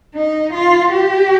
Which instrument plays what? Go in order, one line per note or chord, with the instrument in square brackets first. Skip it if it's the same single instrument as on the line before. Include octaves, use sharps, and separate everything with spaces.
[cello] D#4
F4
G4